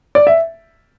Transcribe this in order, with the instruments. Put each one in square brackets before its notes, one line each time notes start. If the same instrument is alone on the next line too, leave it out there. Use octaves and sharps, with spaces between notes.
[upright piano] D5
E5